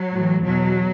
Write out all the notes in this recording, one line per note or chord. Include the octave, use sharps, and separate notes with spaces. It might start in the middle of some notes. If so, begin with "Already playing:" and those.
Already playing: F#3
A2 E3
E2 B2 F#3